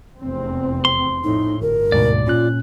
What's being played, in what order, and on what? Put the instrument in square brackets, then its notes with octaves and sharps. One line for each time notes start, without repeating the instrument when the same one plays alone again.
[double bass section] F1 E2 C4
[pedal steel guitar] C6
[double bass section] A#1 F2 A2 [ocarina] D#4
[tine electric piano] G1 [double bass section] G2 [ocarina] A#4
[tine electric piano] D2 G#2 B2 [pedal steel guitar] D5
[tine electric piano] A#2 C#4 F#6 [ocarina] F4